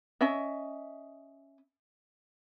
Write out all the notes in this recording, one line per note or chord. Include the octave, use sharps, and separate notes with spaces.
C#4 D#5 E5